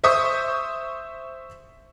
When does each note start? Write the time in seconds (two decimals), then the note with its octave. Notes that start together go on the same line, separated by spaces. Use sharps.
0.04 C5 E5 C#6 D#6 G6 B6